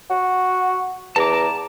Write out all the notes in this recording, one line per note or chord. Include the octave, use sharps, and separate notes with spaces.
F#4
E2 A5 A#5 D6